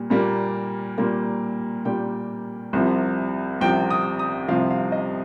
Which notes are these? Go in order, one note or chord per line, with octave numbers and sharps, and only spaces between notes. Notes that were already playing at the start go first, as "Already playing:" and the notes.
Already playing: A#2 G3 A#3
A#2 G3 A#3
A#2 G3 A#3
A#2 G3 A#3 G5
C2 C3 F3
C2 C3 F3 G5
D#6
D#6
C2 C3 F3 F5
F5
D#5